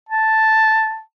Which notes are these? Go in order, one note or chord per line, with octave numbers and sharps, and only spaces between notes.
A5